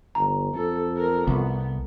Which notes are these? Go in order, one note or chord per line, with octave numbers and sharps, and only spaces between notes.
G1 A#5
F2 A4
A#4
C2 B3